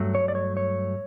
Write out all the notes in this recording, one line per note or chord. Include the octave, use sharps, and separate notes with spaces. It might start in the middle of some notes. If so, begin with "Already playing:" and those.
Already playing: G2 F#3 A3
C#5
D5
C#5
C#5